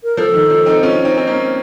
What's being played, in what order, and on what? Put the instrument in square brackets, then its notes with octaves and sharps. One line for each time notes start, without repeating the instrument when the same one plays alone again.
[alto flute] A#4
[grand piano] F3 [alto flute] A4
[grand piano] D#3
F3
C4 D#4
C#4 F4
C#4
C4 D#4
C4
A#3 C#4